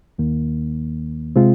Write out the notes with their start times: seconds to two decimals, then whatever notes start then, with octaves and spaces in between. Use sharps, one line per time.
0.18 D#2 D#3 A#3
1.36 C3 G#3 C4 F4